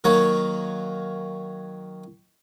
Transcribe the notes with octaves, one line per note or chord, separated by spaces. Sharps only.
D#3 F#3 A#3 C#5